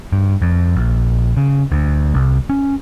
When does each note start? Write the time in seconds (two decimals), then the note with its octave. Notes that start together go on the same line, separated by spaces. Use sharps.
0.13 G2
0.42 F2
0.76 A#1
1.37 C#3
1.72 D2
2.14 C2
2.50 C#4